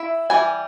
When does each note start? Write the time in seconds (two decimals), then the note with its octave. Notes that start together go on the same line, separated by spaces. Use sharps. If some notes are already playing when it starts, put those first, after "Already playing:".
Already playing: E4 E5
0.30 E3 G3 G#5